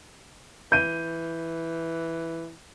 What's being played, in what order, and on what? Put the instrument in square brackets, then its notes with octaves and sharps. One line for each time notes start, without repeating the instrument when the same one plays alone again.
[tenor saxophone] E3 [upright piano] G6 D#7